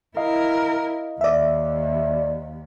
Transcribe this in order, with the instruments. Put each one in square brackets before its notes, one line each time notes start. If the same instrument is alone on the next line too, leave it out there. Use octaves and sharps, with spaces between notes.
[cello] E4 A#4 [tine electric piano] D#5 F5
[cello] D#2 [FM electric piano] D5 E5